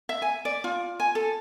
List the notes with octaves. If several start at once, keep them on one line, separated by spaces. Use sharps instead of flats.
E5
G#5
D5
F4
G#5
A4